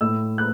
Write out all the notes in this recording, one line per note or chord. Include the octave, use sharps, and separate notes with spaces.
A2 E6
F#6